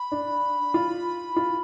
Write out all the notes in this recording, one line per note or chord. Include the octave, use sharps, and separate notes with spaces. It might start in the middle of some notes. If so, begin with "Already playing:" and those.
Already playing: B5
D4
F4
F4